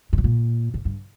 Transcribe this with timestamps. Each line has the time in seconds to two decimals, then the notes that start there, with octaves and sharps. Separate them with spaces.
0.13 G#2
0.18 A2
0.24 A#2
0.74 G#2
0.85 G2